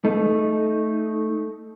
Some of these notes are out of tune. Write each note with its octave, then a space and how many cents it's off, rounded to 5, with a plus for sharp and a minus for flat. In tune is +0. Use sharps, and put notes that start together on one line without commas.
A3 +0 D#4 +0 A4 -20